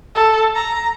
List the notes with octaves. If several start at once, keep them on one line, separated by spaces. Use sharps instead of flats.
A4
A#5